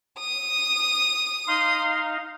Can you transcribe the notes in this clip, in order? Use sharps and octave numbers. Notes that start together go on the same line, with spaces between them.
D#6
D#4 F5 C6